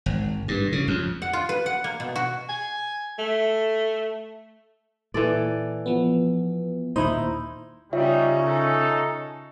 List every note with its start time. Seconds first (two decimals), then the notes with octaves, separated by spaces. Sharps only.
0.06 G#1
0.48 G2
0.72 C#3
0.88 F2
1.22 F#5
1.33 F4
1.49 B4
1.66 F#5
1.84 A#3
2.00 B2
2.16 F#4
2.49 G#5
3.19 A3
5.14 A#2 E3 A4 D5
5.86 F3 B3
6.96 D#2 A#2 D#4 E4 C5
7.93 C#3 G3 C#4 D#4 F4 C#5 E5
8.40 D#4 A4